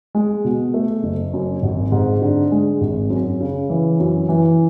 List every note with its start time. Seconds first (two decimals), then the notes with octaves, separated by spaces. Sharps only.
0.15 G#3
0.44 B2
0.74 A3
1.03 F#1
1.33 F#2
1.62 G#1
1.92 G#2
2.22 D3
2.52 G#3
2.81 G#1
3.10 F#2
3.40 C#3
3.70 E3
4.00 F#2
4.29 E3